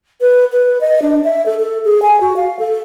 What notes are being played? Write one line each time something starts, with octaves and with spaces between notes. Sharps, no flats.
B4
B4
D#5
D4
E5
A4
A4
G#4
G#5
F#4
F5
A4